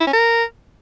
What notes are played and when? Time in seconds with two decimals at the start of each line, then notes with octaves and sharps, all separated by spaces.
0.01 E4
0.07 C#4
0.13 A#4